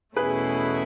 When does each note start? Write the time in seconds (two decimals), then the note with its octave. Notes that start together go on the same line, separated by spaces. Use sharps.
0.16 E2 B2 A3 C#4 E4 G#4 B4